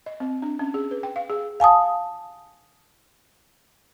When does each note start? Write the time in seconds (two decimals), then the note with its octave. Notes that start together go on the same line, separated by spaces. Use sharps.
0.06 D#5
0.20 C4
0.42 D4
0.59 C#4
0.74 G#4
0.91 B4
1.03 G5
1.16 F5
1.30 G#4
1.60 F5 G#5 A5 D#6